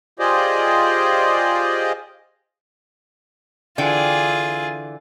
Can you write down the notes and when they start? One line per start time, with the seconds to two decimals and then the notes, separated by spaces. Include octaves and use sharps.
0.19 F4 G4 G#4 C5 D5 D#5
3.78 D3 E3 F4 G#4 G5